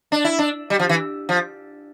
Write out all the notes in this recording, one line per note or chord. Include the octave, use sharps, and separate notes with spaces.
D4
E4
D4
G3
F3
E3
F3